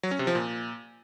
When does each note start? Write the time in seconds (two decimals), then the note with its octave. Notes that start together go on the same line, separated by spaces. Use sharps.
0.03 F#3
0.11 C#4
0.19 C3
0.27 F3
0.35 A#2